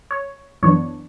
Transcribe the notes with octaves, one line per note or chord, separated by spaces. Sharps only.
C#5
F#2 E3 B3 D4 C#5